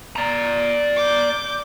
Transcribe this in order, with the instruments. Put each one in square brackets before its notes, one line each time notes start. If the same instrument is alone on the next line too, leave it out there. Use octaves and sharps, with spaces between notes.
[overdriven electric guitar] D5 A#5
[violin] D6 G6